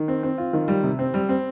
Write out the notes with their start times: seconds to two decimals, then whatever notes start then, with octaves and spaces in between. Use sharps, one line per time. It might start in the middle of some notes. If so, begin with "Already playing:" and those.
Already playing: D#3
0.08 C4
0.23 C4
0.38 F4
0.53 D#3
0.68 G3
0.83 C3
0.99 C4
1.14 G3
1.29 C4